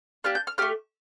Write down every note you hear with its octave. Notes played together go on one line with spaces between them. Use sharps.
A#3 D4 G4 F6
G6
F6
A3 D#4 G4 F6